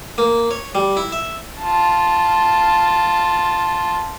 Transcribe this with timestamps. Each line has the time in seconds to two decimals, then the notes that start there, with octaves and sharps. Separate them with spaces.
0.18 A#3
0.51 C#5
0.75 G3
0.97 E4
1.12 E5
1.60 F4 A5